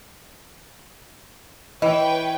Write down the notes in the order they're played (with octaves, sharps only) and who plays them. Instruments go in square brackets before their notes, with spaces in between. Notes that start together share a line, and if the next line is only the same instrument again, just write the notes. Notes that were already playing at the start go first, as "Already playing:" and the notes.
[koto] E3 [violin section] B4 C#5 G5 [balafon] D#5